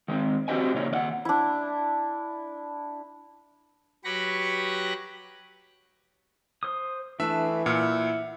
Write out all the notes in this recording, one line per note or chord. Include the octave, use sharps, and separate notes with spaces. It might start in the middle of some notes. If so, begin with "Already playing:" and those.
D#3 G#3 C4
C4 F#4 G4 C5 D#5 G#5
A#2 C#3 C#4 D#4
D#2 D5 F#5
D4 E4
F#3 G4 B4 B5 C#6 A#6
C5 D#6
E3 A3 D4 B4 E5 A5
A#2 E4 F#5 B5 F6